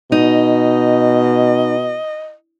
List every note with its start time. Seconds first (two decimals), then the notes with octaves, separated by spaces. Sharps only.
0.12 B2 D#4 D#5